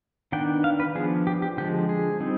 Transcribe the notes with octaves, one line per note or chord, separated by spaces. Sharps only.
D#3 B3 D4 G5
F5
B4
F3 B3 D4 G#4
G4
G4
D3 F3 G#3 G4
G#4
G3 C4 D#4